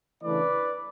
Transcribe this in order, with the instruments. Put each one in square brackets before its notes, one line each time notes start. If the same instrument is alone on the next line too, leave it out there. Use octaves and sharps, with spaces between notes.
[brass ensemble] C#3 E3 A3 D4 B4 D5